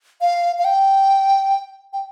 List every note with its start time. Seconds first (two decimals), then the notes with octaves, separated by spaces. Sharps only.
0.21 F5
0.59 F5
0.64 G5
1.93 G5